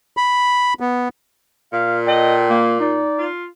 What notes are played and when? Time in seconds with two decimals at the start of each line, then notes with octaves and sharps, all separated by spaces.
0.17 B5
0.80 B3
1.73 A#2 F5
2.08 A4 D#5 G5
2.50 A#3
2.80 D#4 D5
3.19 F4